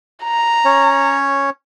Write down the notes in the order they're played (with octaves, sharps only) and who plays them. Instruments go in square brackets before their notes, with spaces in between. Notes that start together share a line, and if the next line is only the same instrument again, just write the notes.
[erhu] A#5
[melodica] C#4 C#5